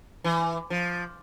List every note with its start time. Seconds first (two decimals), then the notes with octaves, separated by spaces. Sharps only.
0.24 E3
0.70 F3